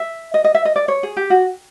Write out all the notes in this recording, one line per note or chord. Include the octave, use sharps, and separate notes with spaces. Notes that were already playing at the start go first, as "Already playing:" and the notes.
Already playing: E5
D#5
D#5
E5
D#5
D5
C#5
G#4
G4
F#4